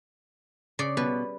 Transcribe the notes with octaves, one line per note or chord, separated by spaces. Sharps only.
C#3 D5
B2 G3 B4